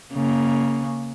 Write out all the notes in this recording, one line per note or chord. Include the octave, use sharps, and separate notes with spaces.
C#3 A#3